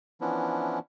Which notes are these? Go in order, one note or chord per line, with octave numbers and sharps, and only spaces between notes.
E3 F3 B3 C#4 D4 E4